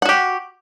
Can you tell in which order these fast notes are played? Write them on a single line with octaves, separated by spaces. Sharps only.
F#5 F#4 G4